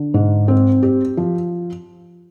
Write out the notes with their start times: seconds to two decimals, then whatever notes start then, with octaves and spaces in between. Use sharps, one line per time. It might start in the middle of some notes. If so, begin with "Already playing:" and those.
Already playing: D3
0.14 G#2
0.48 C4
0.83 G4
1.17 F3